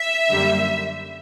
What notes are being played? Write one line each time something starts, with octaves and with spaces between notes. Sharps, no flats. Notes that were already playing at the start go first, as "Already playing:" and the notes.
Already playing: E5
F#2 D3 G3 A#3